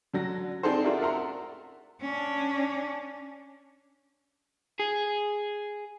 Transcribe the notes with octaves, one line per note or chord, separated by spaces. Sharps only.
D3 F#3 A#6
C4 D4 D#4 G#4 A4 C5
F4 F#4 G#4 A#4 D5 E5
A#4 E5 F#5 A#5 C6
C#4 D4
G#4